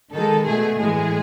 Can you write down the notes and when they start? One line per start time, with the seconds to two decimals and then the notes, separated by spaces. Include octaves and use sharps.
0.13 D#3 G#3 A4
0.47 B2 A3 G#4
0.79 A2 E3 G#3 G#4